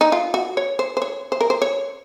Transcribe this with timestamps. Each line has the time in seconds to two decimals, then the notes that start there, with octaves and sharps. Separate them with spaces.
0.01 D#4
0.12 F4
0.34 F#4
0.57 C#5
0.79 C5
0.97 C5
1.02 C#5
1.32 C5
1.41 A#4
1.50 C5
1.62 C#5